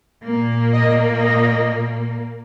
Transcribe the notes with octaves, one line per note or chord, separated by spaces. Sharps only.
A#2 A#3
D#5
D#5